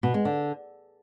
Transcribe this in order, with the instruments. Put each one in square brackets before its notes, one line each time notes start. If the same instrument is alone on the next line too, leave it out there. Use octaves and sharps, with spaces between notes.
[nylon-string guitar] B2
G#3
D3